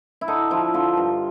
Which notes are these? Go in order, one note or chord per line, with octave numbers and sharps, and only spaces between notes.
E4
D3 D#4
F3 E4
D3 F4
G2